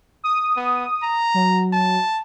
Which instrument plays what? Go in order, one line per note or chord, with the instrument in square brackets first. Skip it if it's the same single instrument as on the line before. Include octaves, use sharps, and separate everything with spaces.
[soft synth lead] D#6
[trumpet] B3
A#5
[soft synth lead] F#3
[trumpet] A5